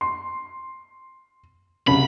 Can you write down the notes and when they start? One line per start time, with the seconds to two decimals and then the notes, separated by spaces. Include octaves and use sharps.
0.01 C6
1.87 C2 F#2 C#3 B5